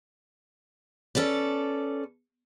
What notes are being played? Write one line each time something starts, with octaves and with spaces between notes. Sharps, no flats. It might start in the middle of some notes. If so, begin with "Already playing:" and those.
C#4 A4 B4 D5